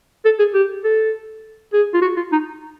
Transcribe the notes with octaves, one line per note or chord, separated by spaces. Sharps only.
A4
G#4
G4
A4
G#4
F4
F#4
F4
D#4